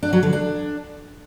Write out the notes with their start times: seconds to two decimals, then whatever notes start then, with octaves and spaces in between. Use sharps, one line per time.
0.03 D4
0.13 F#3
0.23 D3
0.33 D4